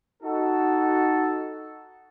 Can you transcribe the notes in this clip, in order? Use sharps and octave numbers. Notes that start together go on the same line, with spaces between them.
D#4 F#4 A4